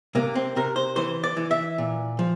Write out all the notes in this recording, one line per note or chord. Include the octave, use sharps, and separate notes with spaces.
C3 A#3
C4
C3 A#4
C5
E3 C5
D5
E3
E5
A#2
F3